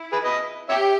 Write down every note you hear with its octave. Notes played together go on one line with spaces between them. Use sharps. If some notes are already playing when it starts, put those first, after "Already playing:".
Already playing: E4
G#4 B4
B4 D#5
G4 C#5 E5